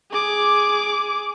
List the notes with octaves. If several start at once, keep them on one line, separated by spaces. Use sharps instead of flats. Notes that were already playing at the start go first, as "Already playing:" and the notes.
G#4 D6